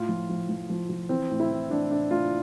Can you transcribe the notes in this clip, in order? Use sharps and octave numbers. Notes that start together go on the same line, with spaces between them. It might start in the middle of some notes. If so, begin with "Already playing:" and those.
Already playing: A2 F4
F3
F3
F3
F3
F3
E3 C4
A2
E4
E3
E3 D4
A2 D4
A2 F4